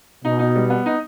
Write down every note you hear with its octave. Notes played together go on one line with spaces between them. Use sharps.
B2 D#4
D#4
G3
B3
D#4